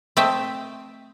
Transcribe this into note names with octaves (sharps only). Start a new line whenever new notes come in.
A3 C4 D#5 E5 G5 A5